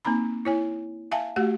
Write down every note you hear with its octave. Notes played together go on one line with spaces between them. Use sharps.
A#3 C4 D#4 A#5 B5
E4 C#5 G#5
E5 F5 G#5 A5
A3 F#4 G4 F#5